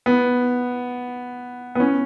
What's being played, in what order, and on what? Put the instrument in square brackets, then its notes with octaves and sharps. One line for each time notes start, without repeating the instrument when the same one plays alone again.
[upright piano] B3
B3
C#4